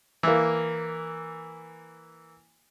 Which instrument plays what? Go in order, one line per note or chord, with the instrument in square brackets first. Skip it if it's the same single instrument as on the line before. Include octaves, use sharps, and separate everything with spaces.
[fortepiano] E3 A#3